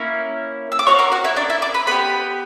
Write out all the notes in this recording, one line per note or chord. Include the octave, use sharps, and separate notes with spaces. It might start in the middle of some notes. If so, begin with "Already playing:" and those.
Already playing: A#3 C#4 E4
E6
D6
A#3 D4 F#4 C#5 C#6
A#4 A#5
F#4 F#5
E4 E5
D4 D5
E4 E5
D5 D6
B4 B5
B3 E4 G4 B4 B5